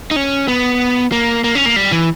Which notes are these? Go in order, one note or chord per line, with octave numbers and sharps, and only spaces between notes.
D#4
C#4
B3
A#3
A#3
C#4
A#3
G3
E3